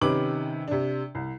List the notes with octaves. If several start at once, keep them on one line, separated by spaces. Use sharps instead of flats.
C3 D#3 C#4 B4 D6 F#7
C3 D4
C2